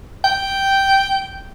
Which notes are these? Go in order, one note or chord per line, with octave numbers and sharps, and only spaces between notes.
G5